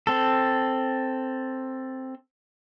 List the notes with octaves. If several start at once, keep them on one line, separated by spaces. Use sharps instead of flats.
C4 A4